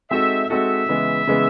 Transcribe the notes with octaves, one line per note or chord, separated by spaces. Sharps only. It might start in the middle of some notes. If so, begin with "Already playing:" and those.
G#3 C4 D#4 F#4 A4 E5
G#3 C4 D#4 F#4 A4 E5
C#3 E3 G#3 B3
C#3 E3 G#3 B3